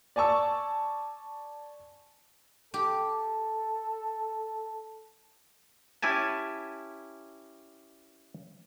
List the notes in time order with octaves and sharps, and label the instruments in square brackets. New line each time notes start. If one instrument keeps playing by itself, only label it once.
[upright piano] D5 G#5 A5 C#6 E6
[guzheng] G4 [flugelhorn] A4
[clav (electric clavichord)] C#4 E4 G4 G#5 A5